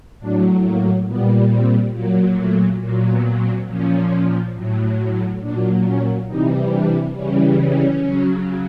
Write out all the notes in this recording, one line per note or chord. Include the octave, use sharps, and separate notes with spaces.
A2 F#3 D4
A#3
A#2 G3 B3
C4
A#2 F#3 A#3
A3
A#2 F#3 A#3
B3
C4
A#2 F3 C#4
A2 F#3
A#2 F#3 D4
C#4
C3 E3 G3 D#4
D4
C#3 E3 G3 C#4
C#4
C#3 F#3